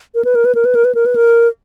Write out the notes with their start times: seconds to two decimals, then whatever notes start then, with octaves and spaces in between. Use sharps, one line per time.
0.15 A#4
0.25 B4
0.35 A#4
0.45 B4
0.55 A#4
0.65 B4
0.75 A#4
0.85 B4
0.95 A#4
1.06 B4
1.15 A#4